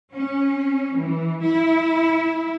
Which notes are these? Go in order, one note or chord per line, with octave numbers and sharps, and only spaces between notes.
C#4
E3
E4